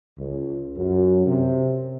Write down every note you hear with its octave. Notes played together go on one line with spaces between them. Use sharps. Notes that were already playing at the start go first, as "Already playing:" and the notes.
C#2
F#2
C3